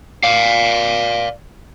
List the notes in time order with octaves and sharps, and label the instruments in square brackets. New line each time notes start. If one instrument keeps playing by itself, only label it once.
[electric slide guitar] D5 F5